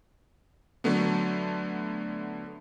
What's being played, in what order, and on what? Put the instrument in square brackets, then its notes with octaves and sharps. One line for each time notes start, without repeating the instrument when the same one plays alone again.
[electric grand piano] D3 F#3 A3 B3